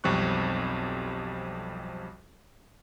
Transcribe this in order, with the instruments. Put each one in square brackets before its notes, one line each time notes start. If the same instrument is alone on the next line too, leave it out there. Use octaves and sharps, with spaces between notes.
[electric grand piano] B1 F2 G3 C4 C#6 F#6